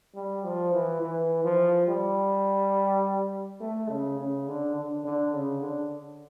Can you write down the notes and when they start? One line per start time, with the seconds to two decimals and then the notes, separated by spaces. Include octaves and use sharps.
0.15 G3
0.44 F3
0.72 E3
1.01 E3
1.44 F3
1.87 G3
3.61 A3
3.89 C#3
4.18 C#3
4.47 D3
4.76 D3
5.05 D3
5.33 C#3
5.62 D3